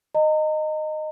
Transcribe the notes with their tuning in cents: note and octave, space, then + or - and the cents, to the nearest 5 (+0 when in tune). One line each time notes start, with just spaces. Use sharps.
D#5 -10 A#5 -35